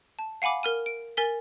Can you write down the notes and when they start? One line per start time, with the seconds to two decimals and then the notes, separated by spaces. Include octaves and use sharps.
0.19 A5
0.42 F5 F#5 G#5 B5 D6
0.63 A#4 F6 D#7
0.86 D7
1.17 A#4 G#5 A6 B6 G7